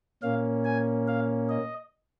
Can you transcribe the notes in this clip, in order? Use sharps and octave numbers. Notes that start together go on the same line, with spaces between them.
A#2 A#3 C#4 F5
G#5
F5
D#5